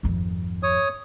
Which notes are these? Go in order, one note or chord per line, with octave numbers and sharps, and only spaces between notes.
G#1 F2
C#5 D#6